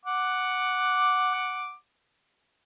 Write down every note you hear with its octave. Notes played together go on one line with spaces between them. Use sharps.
F#5 D6